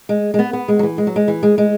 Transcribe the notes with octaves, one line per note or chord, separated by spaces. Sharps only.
G#3
G#3
B3
B3
G#3
F#3
E3
G#3
F#3
G#3
E3
G#3
G#3